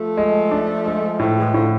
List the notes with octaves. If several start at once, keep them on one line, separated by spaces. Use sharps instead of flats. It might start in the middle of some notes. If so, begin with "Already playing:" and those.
Already playing: F3 A3
G#3
D4
G#3
A2 F3 A3
E3 G#3
A2 D3 F3